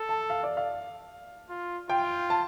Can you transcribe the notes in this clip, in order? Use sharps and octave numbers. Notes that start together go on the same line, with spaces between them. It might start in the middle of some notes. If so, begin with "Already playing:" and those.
Already playing: A4
A5
F5
D5
F5
F4
F4 G5
A5